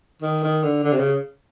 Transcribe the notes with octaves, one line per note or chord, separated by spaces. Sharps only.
D#3
D#3
D3
D3
C3
C#3